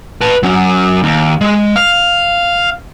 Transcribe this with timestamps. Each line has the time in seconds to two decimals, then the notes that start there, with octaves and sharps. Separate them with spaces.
0.21 B4 A5
0.43 F#3 C#4
1.03 D#2
1.41 G#3
1.76 F5